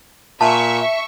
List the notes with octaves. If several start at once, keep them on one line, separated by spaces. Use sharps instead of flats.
A#2 E5 A5 C#6